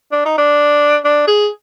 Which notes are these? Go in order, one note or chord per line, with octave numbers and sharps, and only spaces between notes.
D4
D#4
D4
D4
G#4